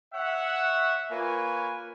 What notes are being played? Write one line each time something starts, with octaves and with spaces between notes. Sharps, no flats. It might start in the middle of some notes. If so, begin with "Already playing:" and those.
C#5 E5 F#5
A#3 F4 B4 C#5 G#5